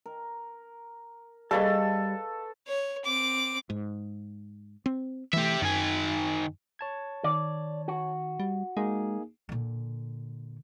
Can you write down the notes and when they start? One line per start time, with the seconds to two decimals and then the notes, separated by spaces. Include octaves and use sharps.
0.06 A#4
1.51 G3 G#4 A4 B4 D#5 F5 A5 C#6
2.67 C#5
3.05 C4 D6
3.70 G#2
4.86 C4
5.33 E3 A3 G4 E5
5.62 F#2 D#3 G#5
6.79 C#5 A5 G#6
7.24 D#3 D5
7.88 F#4
8.40 G3
8.77 G#3 A#3 D#4 G#4
9.49 A#2 D3